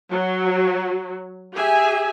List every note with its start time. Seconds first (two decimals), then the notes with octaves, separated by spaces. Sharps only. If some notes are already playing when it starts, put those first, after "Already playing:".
0.11 F#3
1.54 G4 G#4 E5 G#5